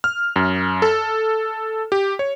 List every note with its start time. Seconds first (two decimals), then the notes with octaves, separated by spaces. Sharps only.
0.04 F6
0.36 F#2
0.82 A4
1.92 G4
2.19 C#5